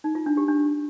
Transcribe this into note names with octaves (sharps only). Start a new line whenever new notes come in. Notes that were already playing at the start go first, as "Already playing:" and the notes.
D#4
F4
D4
G4
D4